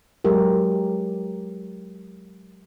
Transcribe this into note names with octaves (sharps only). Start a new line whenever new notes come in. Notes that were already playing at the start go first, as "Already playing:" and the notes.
F#3 G#3 G4 A#4